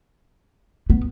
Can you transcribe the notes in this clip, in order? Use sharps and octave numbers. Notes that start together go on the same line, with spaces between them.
B3